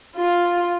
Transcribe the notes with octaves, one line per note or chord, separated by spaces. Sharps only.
F4